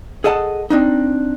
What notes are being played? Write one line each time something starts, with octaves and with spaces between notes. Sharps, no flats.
G#4 A4 D#5 F#5 A5
C4 D4 D#4